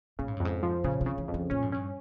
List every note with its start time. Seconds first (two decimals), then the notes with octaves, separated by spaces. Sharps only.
0.19 A#2 C#3
0.28 G#2
0.37 G2
0.40 F2 G#2
0.63 F3
0.84 A#2 C#3
1.01 C3
1.06 C#3
1.18 E3
1.28 F2
1.34 F3
1.50 A#2 C#4
1.62 G#2
1.72 G2 C#4